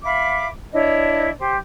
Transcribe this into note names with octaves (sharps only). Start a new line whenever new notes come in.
E5 F5 B5 D6
D4 E4 C#5 D#5
G4 C5